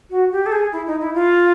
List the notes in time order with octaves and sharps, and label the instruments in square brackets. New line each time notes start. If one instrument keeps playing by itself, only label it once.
[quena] F#4
G4
A4
G#4
E4
D#4
E4
F4